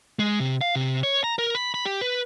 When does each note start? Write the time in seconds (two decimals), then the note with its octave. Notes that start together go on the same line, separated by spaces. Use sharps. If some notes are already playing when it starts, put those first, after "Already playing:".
0.19 G#3
0.40 C3
0.61 F5
0.75 C3
1.03 C#5
1.24 A#5
1.39 A#4
1.55 B5
1.74 B5
1.85 G4
2.01 B4